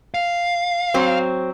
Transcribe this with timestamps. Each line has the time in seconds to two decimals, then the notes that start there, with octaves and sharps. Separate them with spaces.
0.14 F5
0.94 F#3 C4